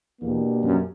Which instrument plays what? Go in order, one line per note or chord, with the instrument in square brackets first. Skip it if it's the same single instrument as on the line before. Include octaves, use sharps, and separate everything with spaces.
[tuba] E2 [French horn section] B2 A#3 D4 G4
[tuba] F#2